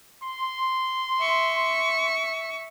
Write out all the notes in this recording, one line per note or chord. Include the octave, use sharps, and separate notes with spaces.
C6
E5 C#6